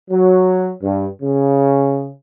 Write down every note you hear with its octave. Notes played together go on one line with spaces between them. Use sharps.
F#3
G2
C#3